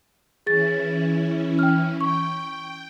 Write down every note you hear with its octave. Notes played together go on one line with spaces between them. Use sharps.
E3 C#4 E4 G#4 A6
G5 F6
G5 C#6